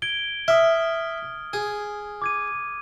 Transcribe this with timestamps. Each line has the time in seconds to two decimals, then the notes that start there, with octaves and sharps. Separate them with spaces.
0.02 G#6 D7 G7
0.48 E5 D#6 F6
1.53 G#4
2.22 D6 G#6 D#7